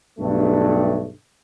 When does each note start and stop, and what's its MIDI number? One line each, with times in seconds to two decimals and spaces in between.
0.19 1.07 35
0.19 1.07 43
0.19 1.07 57